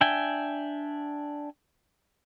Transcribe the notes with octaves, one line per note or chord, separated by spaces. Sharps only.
D4 E5 G5 G#5